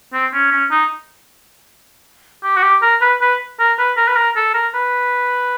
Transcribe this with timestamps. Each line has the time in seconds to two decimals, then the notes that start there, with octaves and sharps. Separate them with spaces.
0.13 C4
0.33 C#4
0.51 C#4
0.71 D#4
2.43 G4
2.57 F#4
2.63 G4
2.82 A#4
3.01 B4
3.21 B4
3.59 A#4
3.78 B4
3.97 A#4
4.08 B4
4.17 A#4
4.36 A4
4.54 A#4
4.74 B4